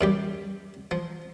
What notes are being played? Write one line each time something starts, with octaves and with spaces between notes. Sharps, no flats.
F#2 G3 G4
F3